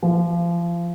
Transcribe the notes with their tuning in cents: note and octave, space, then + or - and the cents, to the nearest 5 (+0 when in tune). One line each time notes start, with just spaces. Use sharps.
F3 -30